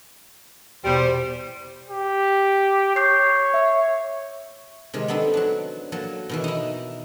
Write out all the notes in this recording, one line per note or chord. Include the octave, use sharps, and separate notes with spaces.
E2 B2 G3 C5
G4
C#5 D6 G6 C7
E5
C3 D#3 G#3
B3 C4 D4 D#4 A4
F#3 D4
F#3 A#3 A5
B2 D#3 E3
D#4 E4